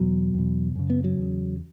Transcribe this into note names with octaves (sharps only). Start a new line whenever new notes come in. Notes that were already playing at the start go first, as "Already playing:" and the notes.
Already playing: E2 B2 F#3
E2 B2
F#2 C#3
B3
F#3
E2 C#3